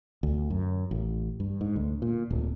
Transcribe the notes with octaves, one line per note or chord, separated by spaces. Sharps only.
D2
F#2
A1
G2
G#2
D2
A#2
D1